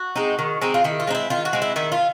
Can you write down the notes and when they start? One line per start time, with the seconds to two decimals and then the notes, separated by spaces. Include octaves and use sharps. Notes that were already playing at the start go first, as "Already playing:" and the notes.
Already playing: F#4
0.16 G#3 C4 D#4
0.39 D#3
0.62 G#3 C4 D#4
0.74 F4
0.84 D#3 E4
1.00 F4
1.07 G#3 C4 D#4
1.15 E4
1.30 D#3 F4
1.45 F#4
1.53 G#3 C4
1.62 E4
1.76 D#3 E4
1.92 F4